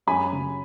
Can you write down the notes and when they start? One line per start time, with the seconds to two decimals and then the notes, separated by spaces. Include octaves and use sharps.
0.07 F#2 G#5 B5
0.33 C#3